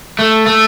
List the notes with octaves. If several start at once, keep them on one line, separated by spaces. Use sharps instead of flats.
A3
A3